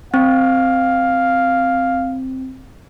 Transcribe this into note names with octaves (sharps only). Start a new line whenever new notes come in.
C4 F5